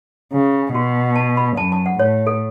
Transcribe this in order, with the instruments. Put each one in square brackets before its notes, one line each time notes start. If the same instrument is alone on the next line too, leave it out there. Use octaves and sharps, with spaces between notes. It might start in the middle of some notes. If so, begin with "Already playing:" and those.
[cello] C#3
[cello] B2 [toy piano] F#4
[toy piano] A5
B5
[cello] F#2 [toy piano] A5
[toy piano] A5
F#5
[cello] A2 [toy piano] C#5
[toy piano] A4